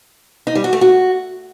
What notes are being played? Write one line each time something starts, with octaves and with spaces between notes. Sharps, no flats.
D#4
G3
F#4
A3
F#4